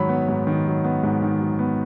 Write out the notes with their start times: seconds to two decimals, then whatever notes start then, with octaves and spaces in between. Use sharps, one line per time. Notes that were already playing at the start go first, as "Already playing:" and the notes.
Already playing: G#2 D#3 F#3 B5
0.09 B3
0.28 G#2
0.47 D#3
0.66 F#3
0.84 B3
1.03 G#2
1.22 D#3
1.41 F#3
1.59 B3